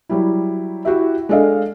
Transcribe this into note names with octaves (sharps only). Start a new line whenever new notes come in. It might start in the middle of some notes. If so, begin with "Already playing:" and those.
F#3 G3 E4
E4 F#4 G4 E5
G#3 D4 A4 D#5 F5